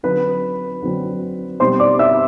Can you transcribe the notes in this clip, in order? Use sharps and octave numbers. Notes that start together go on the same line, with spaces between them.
D3 F#3 C4 B4 B5
D3 F#3 C4
B2 G3 C4 C5 C6
D5 D6
E5 E6